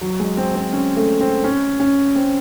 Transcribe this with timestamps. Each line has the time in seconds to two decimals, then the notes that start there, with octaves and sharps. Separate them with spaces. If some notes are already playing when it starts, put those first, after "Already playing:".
0.01 F#3
0.20 G#3
0.37 C4
0.55 C4
0.73 C#4
0.97 A3
1.21 C4
1.44 C#4
1.80 C#4
2.15 C4